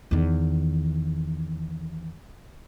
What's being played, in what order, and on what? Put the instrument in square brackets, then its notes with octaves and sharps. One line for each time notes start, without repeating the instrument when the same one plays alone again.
[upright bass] E2 D#3